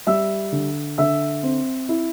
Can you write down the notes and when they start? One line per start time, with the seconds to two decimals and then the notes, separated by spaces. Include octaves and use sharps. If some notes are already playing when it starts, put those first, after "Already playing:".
0.07 G3 E5 E6
0.52 D3
0.98 D3 E5 E6
1.43 C4
1.89 E4